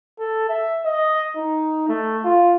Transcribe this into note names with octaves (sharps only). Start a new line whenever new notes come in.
A4
E5
D#5
D#4
A3
F4